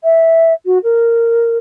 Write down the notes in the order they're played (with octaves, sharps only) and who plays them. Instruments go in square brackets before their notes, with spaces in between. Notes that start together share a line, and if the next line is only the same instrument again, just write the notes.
[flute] E5
F#4
A#4